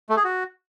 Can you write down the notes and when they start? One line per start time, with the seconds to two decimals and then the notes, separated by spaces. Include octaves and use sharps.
0.09 A3
0.17 G#4
0.24 F#4